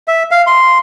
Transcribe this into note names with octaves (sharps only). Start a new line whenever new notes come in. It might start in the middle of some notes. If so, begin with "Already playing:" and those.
E5
F5
C6